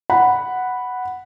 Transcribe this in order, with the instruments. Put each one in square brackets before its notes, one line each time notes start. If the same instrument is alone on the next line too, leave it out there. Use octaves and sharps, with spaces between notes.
[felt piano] F#5 B5